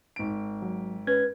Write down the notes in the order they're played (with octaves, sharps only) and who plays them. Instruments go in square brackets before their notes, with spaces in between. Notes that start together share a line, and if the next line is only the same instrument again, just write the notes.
[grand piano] G#1 D7
[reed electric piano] F#3
[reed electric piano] C#4 G#6 [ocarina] B4